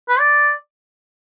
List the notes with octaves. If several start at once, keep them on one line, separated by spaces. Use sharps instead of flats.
B4
D5